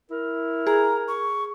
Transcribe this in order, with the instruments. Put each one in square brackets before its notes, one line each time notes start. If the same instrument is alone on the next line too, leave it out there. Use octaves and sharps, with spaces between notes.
[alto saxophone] E4 [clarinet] A#4
[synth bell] G#4 [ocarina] A#5
[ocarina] C#6